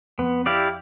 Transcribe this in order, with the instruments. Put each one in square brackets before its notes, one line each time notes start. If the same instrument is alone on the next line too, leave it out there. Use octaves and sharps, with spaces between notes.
[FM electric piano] F2 [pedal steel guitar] B3
[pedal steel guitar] E4 G4 D5 F5